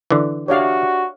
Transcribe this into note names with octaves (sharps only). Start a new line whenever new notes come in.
D3 E3
D4 F#4 G4 C#5 D5 E5 F5